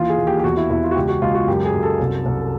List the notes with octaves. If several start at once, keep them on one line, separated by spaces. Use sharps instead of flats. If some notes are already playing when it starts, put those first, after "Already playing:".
Already playing: D#2 E3 F4
G#4
D#2
G4
G4
E2 F#4
E4
E2 E4
F4
F#4
C#2 G4
F#4
C#2 F4
F#4
F#2 G4
G#4
F#2
A4
C2
C2